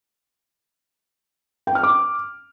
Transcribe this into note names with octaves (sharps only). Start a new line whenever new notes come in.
G5
F6
D6